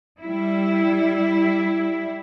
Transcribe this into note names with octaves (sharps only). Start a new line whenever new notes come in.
G3 E4